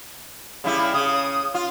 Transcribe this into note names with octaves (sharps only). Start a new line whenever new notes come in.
C#3 G3 E4
C#3 D#6
F4